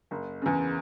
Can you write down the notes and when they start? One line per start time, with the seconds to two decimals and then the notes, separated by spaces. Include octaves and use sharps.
0.11 F#1
0.42 E2 C#3